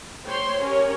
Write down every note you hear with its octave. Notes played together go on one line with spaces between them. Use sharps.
C5 C#5 G5 C6
C#4 G4 A#4 C#5